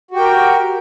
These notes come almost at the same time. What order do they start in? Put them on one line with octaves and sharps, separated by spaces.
F#4 G4 G5 A#4